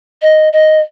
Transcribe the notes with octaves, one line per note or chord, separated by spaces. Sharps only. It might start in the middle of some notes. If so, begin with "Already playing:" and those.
D#5
D#5